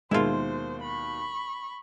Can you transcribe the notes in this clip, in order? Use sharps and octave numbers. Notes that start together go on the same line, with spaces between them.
D#2 B2 D#3 G#3 E4 F4 C5
B5 C#6